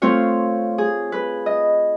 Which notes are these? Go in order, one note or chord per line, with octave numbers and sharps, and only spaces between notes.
A3 C4 F4 C#5 F5
G#4
B4
D#5